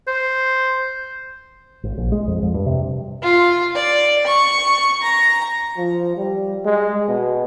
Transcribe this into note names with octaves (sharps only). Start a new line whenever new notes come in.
C5
G#1
A#1
G#3
F2
F2
G2
C3
F4
D5
C#6
A#5
F3
G3
G#3
B2